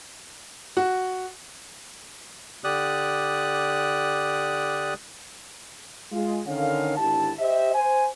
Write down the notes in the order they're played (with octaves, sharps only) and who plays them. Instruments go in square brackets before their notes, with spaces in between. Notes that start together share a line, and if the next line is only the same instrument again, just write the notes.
[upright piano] F#4
[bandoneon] D3 G4 D5 D#6 F#6
[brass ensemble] G#3 F4
D3 D#3 C#4 F5
G#1 D3 D4 E4 G4 A5
G4 C5 D#5 E5
C5 G#5